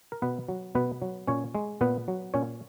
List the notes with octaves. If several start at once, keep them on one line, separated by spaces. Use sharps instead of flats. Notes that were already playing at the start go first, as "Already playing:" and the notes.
A#4
B2 B3 B4
F#3
B2 B3 B4
F#3
A#2 C#4 C#5
G#3
A#2 B3 B4
F#3
A#2 C#4 C#5